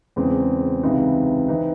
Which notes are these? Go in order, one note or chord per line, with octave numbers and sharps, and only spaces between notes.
E2 C#3 G#3 C4
C#2 C3 E3 C4 D#4
E3 C4 D#4